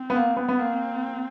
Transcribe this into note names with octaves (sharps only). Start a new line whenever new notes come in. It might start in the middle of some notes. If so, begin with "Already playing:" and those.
Already playing: C4
B3
A#3
B3
B3
A#3 C4